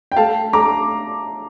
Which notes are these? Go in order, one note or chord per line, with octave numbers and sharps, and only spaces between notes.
G5
A3 F5 A5
A3 A#5 D6